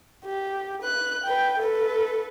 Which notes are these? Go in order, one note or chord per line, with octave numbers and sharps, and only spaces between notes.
G4
B4 F#6
B4 G5
A4 B4